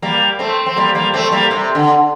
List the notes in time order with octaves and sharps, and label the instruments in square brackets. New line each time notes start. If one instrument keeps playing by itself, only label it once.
[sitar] G3 A#3
A3 C4
C4
G3 A#3
G3 A#3
A3 C4
G3 A#3
C3
D3